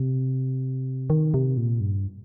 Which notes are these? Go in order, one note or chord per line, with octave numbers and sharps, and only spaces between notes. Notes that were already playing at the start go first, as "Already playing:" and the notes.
Already playing: C3
D#3
C3
A#2
G2